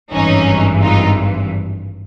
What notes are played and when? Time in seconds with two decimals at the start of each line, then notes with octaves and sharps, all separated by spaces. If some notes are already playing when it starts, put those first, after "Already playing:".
0.12 G#1 G2 E3 C#4 D#4
0.82 D#4 F4